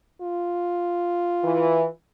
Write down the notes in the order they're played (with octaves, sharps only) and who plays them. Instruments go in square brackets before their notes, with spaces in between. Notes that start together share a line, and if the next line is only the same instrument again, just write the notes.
[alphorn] F4
[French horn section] E3